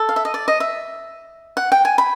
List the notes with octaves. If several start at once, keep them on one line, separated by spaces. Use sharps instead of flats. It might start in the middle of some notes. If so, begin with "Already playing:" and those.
Already playing: A4
F5
E5
D#5
D5
D#5
E5
F#5
G5
G#5
B5